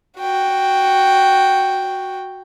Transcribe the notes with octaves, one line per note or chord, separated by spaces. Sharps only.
F#4 G5